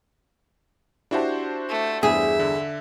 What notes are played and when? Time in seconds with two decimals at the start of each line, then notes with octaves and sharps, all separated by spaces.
1.11 D4 E4 F#4 G4 C5 A5
1.69 A3
2.03 E2 G2 G#4 E5
2.40 D3